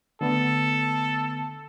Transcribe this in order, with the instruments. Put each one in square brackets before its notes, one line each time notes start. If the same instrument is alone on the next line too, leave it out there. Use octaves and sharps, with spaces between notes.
[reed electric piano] D3 A3 B3 [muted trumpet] A4